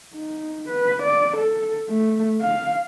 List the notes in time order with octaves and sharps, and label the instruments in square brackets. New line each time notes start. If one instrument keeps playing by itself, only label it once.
[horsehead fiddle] D#4
B4
D5
A4
A3
F5